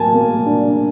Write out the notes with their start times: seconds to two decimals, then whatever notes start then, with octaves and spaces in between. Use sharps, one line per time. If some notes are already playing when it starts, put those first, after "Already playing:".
Already playing: A2 F#3 A#3 G#5 A5
0.14 A#3
0.46 D4